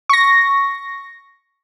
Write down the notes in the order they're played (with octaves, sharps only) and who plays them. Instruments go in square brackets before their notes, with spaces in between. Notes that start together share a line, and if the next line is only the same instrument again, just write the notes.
[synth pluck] C#6 A#6